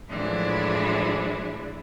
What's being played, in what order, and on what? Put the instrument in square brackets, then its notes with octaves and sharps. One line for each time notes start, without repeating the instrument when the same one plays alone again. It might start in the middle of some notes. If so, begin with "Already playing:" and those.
[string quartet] A2 E3 F3 G#3 D4 E4